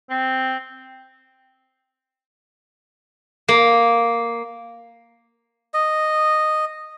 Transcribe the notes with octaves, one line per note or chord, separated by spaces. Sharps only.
C4
A#3
D#5